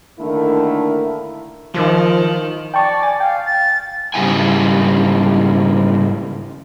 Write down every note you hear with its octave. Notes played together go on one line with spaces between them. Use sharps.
D3 D#3 A3 A#3 E4 A#4
D#3 F3
D5 G5 A5 C#6
G#5 A6
F5 G5
A6
G#2 C#3 G3 E4 F#5 G#5